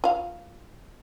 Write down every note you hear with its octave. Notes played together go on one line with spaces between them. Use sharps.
F4 F5